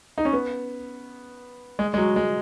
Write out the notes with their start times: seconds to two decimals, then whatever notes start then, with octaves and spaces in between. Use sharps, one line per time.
0.18 D#4
0.25 C#4
0.33 B3
1.79 G#3
1.94 G#3
1.98 F#3
2.16 G#3